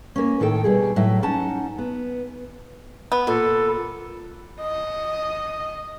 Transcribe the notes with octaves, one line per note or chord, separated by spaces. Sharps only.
A#3 C#4
A2 D#3 A4 G5
B2 G3 G#4
A2 F#3 E5
C#4 D#4 F#5 A5
B3
B3
A#2 A4
D#5